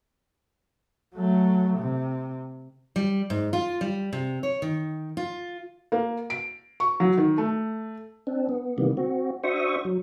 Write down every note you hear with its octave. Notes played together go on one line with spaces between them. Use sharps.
F#3 A3
C3
G3
G#2
F4
G3
C3
C#5
D#3
F4
A#3
D7
C#6
F#3
D#3
A3
C4 D4
B3
C3 D#3 E3 G3 A#3 B3
C4 F#4
D4 F#4 C5 E5 C#6 D#6
F#3